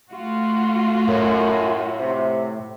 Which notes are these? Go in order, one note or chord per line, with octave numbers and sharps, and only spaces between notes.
A3 F4 F#4
F#2 A2
C3